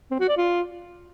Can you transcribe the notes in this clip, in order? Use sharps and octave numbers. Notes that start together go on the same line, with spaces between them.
C4
F#4
D5
F4